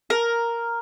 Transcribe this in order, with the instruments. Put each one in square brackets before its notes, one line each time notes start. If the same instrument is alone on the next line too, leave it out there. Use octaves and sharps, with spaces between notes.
[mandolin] A#4